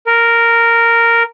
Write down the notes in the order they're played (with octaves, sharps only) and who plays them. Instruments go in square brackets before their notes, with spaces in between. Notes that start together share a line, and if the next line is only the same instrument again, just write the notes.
[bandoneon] A#4